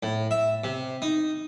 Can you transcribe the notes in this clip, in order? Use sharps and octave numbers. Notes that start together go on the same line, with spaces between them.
A2
E5
C3
D#4